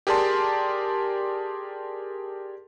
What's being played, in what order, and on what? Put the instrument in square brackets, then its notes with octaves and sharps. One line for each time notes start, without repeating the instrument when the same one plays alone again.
[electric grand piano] G4 G#4 A#4 D5 A5 C6